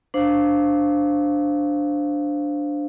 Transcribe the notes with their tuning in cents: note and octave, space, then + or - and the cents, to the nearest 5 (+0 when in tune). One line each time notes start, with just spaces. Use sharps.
D4 +0 C5 -5 F5 +0